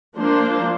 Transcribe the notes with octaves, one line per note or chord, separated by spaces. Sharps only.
F3 A#3 D4 C5